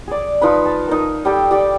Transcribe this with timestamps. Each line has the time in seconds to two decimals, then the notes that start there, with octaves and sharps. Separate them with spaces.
0.08 G#4 D5
0.41 F3 D#4 B4 B5
0.65 A5
0.88 D#4 A#4
1.25 G3 G4 A4 G5
1.51 G4 D5 G5